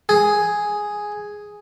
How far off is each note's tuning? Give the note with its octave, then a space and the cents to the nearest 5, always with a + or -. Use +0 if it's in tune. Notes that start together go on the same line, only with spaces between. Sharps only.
G#4 +0